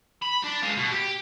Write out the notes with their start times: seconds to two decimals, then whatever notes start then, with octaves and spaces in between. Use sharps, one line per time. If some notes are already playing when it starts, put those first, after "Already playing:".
0.22 B5
0.43 D4
0.63 G#3 F5
0.77 B2
0.91 G4